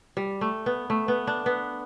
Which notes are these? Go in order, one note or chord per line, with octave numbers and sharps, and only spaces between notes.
G3
A3
B3
A3
B3
D4
B3